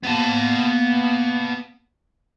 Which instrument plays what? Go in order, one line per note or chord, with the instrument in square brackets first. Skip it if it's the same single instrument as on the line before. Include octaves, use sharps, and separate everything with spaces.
[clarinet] A#3 [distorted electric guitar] B3 A5